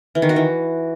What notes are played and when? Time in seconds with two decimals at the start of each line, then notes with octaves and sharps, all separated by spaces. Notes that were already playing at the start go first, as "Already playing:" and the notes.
0.15 E3
0.22 D#3
0.29 F#4
0.36 E3